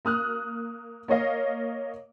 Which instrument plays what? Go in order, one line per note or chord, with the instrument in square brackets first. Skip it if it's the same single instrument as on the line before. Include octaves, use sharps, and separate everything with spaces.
[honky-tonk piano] A#3 D#6 F6 F#6
A#3 C#5 D#5 F5